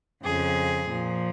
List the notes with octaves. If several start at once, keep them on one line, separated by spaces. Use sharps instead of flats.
F2 C#3 F3 G#4
A#2 F3